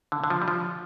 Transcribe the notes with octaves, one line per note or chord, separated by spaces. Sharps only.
D3
D3
F3
G3
F3